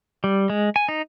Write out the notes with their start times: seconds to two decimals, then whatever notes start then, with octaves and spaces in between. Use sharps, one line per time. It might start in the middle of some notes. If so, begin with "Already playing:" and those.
0.24 G3
0.50 G#3
0.76 G#5
0.89 D#4